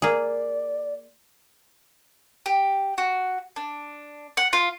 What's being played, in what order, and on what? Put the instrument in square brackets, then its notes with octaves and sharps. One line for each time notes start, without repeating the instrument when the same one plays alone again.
[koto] A#3 G#4 [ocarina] D5
[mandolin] G4
F#4
D4
F#5
F4